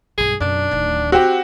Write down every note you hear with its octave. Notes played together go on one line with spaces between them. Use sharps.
B1 G2 G#4
B1 F#2 D4
D1 D#3
C4 F#4 G4